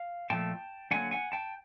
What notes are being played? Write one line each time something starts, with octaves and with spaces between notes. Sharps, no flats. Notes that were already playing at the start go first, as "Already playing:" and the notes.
Already playing: F5
A#2 F3 A3 G5 A5
G2 D3 F#3 A#3 F#5 G#5
F#5 G#5
G5 A5